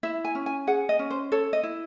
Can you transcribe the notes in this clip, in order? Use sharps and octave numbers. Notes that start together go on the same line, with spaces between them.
E4 E5
G#5
C#4
G#5
G#4 F#5
D#5
C#4
C5
A4 C#5
D#5
E4